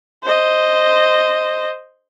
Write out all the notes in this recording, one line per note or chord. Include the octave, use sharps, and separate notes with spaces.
C5 D#5